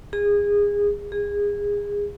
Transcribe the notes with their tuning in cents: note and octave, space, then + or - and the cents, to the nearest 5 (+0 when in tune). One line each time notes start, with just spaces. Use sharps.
G#4 -25
G#4 -25